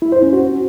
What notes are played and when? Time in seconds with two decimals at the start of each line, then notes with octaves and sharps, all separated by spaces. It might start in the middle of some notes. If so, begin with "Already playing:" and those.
0.02 E4
0.12 C5
0.23 C#4
0.33 F#4